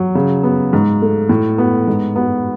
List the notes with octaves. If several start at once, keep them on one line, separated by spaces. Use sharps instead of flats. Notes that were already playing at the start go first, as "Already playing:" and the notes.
Already playing: F#3
C#3
B3
G#2
A3
A2
B3
G#2
B3